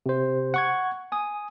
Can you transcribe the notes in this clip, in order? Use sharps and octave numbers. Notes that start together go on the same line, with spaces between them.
C3 C5
F#5 C#6 G#6
G#5 D#6